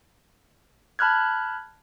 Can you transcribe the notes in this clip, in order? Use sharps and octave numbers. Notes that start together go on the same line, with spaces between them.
A5 B5 F6 F#6 G#6